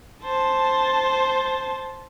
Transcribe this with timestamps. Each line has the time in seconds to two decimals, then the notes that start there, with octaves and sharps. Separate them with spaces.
0.24 C5 A5